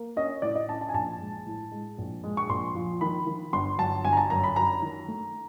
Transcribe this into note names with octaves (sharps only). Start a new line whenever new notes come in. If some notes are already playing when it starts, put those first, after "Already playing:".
Already playing: A#3
C#4 D#5
A2 D5
D#5
C#4 A5
A5
G#5
A#1 A5
G#3
A2
G#3
A#1
G#3
C#6
A#1 C6
F3
D#3 B5
D#3
G1 C6
F#3 A5
G1 G#5
A#5
A5
F#2 A#5
B5
F#2 A#5
D#3
A3